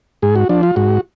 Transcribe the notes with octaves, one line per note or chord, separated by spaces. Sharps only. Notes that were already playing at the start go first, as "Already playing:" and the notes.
G#2 G#4
F#4
F3 D4
F4
G#2 F#4